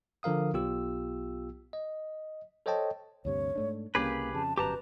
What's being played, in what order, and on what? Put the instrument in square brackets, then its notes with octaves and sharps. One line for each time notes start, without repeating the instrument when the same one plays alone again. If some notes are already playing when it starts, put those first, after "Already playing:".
[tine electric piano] D3 F3 A#4 F5 D#6
B1 B3 F4 G4 E6
D#5
A4 C5 C#5 D#5 G5 A5
[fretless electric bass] D2 G2 C3 [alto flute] C#5
[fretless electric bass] G#2 A3 D4
[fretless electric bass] C2 C#3 C#4 [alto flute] A#3 [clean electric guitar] G4 G#4 B4
[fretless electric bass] F2 C#3 [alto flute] A5
[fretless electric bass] G1 F#2 B2 [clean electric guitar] G4 A5 A#5 [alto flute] B4